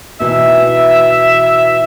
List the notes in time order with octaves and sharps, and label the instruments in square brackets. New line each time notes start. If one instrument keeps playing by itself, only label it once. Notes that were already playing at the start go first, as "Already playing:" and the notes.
[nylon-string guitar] B2 E3 D#4 [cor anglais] E5